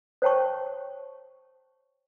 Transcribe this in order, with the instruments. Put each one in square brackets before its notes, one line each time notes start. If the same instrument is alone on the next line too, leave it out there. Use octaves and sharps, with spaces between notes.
[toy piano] C5 C#5 G5 A5 C#6